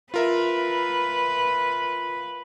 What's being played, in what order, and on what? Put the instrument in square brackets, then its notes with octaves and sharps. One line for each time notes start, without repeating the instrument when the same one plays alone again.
[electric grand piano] F4 A#4 E5 [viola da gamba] B4